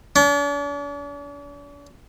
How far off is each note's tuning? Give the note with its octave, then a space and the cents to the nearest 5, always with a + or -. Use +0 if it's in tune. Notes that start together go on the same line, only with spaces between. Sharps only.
D4 -45